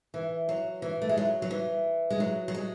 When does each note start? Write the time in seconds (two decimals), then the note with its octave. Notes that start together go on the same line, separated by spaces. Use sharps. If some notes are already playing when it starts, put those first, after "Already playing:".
0.14 E3
0.49 F#3
0.82 E3
1.02 A3
1.09 G#3
1.17 F#3
1.42 F#3
1.51 E3
2.10 G#3
2.20 F#3
2.48 F#3
2.55 G#3